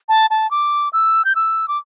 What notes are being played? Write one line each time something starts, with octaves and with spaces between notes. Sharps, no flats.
A5
A5
D6
E6
G6
E6
D6